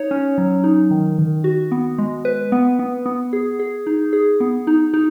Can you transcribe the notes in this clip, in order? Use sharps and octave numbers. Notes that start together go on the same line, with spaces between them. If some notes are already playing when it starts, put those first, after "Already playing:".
Already playing: D#4 C#5
C#4
F#3
D#4
D#3
D#3
F#4
B3
G#3
B4
B3
B3
B3
G#4
G#4
D#4
G#4
B3
D#4
D#4